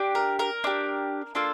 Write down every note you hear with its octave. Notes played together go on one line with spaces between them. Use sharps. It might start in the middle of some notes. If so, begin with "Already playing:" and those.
Already playing: D4 G4
A#4
A#4
D4 G4
A#3 D4 F4 A4